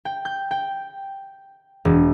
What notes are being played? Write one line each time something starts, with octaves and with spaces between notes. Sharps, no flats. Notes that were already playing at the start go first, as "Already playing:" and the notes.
G5
G6
G5
E1